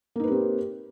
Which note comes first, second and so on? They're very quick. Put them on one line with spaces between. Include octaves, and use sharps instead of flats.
A#3 D#4 B4 G4 C4